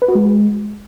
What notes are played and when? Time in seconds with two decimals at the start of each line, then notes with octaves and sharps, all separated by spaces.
0.02 B4
0.08 F#4
0.15 G#3